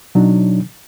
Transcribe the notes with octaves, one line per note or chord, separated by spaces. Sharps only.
B2 F#3 D4 D#4